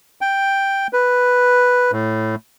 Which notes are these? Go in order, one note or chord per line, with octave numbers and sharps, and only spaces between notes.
G5
B4
A2